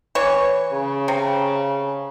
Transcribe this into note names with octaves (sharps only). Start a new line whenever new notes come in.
E3 C#5
C#3
C3